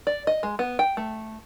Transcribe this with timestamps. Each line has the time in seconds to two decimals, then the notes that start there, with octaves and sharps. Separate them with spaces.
0.07 D5
0.27 D#5
0.43 G#3
0.59 B3
0.79 G5
0.97 A3